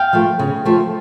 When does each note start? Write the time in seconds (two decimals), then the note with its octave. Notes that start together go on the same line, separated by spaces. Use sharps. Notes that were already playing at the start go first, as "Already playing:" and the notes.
Already playing: F5 G5
0.13 F3 A3
0.39 C#3
0.65 F3 A3